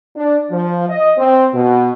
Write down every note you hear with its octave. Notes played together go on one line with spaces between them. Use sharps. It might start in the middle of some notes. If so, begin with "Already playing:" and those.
D4
F3
D#5
C4
B2